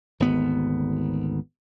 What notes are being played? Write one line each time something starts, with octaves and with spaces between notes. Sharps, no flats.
G#1 D2 B3